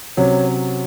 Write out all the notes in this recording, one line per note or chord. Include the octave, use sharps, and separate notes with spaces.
C3 F#3 C#4 C#5